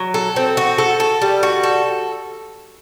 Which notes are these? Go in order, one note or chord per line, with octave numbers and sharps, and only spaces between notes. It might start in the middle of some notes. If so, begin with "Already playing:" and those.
Already playing: F#3
A4
C4
F#4
A4
A4
G3
F#4
A4